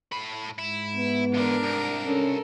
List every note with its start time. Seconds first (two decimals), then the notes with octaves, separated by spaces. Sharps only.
0.12 A2 B5
0.59 G#2 E4
0.95 B3
1.34 D3 E3 D4 A#4
1.63 C2
2.06 C#4 A4 A#4